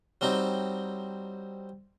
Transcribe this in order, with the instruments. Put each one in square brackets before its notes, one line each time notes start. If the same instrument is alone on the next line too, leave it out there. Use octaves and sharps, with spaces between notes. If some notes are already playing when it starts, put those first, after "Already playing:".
[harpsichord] F#3 G3 C4 D#4